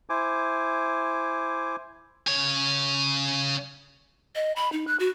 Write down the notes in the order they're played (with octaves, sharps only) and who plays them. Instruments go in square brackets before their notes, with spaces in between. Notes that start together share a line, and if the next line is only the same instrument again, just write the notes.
[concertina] E4 C5 G#5 D6
[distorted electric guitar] C#3 C#5
[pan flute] D#5
B5
D#4
F#6
F#4